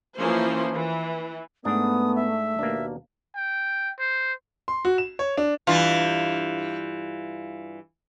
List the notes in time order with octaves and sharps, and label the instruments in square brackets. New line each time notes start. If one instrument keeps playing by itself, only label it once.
[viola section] E3 F3 A#3 C#4 C5
E3
[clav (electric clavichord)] G#2 D4 [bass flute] A3 [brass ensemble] B3 [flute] D#6
[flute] E5
[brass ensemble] D#2 B2 [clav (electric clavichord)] A#3 D4
[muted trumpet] G5
C5
[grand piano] C6
F#4
E7
C#5
D4
[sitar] G2 E3 F4